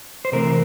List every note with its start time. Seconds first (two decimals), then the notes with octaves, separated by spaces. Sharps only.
0.25 C5
0.32 C3 E3 A3 C4 A#4